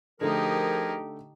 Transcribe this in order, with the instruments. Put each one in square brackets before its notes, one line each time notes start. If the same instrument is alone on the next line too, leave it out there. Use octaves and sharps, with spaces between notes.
[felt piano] D3 A3 [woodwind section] F3 G#4 A#4 [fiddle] D#4 G4